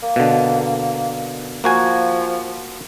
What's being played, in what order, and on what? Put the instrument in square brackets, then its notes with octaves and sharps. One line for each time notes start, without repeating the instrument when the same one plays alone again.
[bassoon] A#3
[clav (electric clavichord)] B2 D3
[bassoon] F3 [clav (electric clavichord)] A#3 F#4 G#5